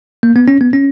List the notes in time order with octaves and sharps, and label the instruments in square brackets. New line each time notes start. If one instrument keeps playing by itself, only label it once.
[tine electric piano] A#3
B3
C#4
B3
C#4